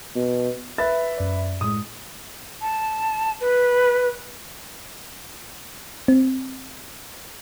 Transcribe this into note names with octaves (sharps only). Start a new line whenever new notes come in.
B2
B4 E5 A6
F#2 D5
A2 G#3 D#6
A5
B4
C4